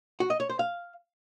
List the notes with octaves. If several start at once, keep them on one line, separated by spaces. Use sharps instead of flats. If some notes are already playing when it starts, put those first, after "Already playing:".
F#4
D#5
C#5
C5
F5